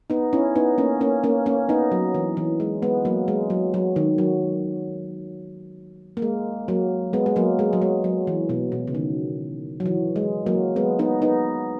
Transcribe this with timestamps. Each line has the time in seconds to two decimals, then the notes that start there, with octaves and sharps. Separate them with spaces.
0.10 B3 D#4
0.33 C#4 E4
0.56 B3 D#4
0.78 A#3 C#4
1.01 A#3 C#4
1.23 A#3 C#4
1.46 A#3 C#4
1.69 B3 D#4
1.92 F#3
2.15 E3
2.37 E3
2.60 G#3
2.82 G#3 B3
3.05 F#3 A#3
3.28 G#3
3.50 F#3
3.74 F#3
3.96 D#3
4.18 F#3
6.17 A#3
6.22 G#3
6.68 F#3 A#3
7.13 G#3 B3
7.26 G#3
7.36 F#3 A#3
7.59 G#3
7.73 F#3
7.82 G#3
8.04 F#3
8.27 E3
8.49 B2
8.72 B2
8.87 C#3
8.95 D#3
9.80 F#3
9.86 E3
10.16 G#3
10.46 F#3 A#3
10.76 G#3 B3
10.99 B3 D#4
11.22 B3 D#4